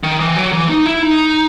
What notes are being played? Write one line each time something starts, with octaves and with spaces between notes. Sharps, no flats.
D#3
E3
F#3
E3
D#4
E4
D#4